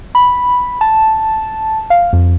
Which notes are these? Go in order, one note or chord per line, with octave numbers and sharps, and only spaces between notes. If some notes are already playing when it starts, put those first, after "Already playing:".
B5
A5
F5
F2